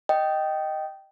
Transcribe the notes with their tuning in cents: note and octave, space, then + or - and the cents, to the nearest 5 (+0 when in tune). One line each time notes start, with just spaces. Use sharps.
D#5 +0 G5 -15